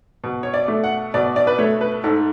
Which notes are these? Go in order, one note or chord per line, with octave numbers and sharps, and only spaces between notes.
B2
C#5
D5
A3
F#5
B2 D5
D5
B4
A3 C#5
B4
G#2 A4